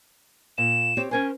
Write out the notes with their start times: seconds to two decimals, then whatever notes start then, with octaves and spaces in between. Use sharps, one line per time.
0.58 A#2 E7
0.97 C4 G4 C#5
1.11 C#4 A#4 C5 G#5